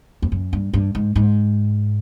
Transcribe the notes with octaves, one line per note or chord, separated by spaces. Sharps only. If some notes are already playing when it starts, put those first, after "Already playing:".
F2
F#2
G2
G2
G#2
G#2